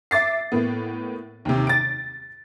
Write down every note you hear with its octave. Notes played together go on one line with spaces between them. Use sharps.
E5 D6 A6 C7
A2 A#3 B3
D#2 C3
A6 D7